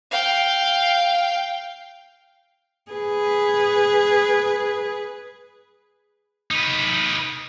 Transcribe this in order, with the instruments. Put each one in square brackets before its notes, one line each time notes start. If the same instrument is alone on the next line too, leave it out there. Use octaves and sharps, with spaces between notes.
[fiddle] F5 G5
[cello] G#4 B4
[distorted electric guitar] D#4 B4